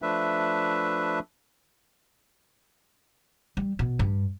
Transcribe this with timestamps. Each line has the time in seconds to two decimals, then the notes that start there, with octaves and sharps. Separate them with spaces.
0.02 F3 A3 D4 B4 E5
3.57 G3
3.79 B2
3.99 G2